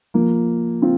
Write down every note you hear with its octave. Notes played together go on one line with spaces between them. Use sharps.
F3 A#3
C4 F4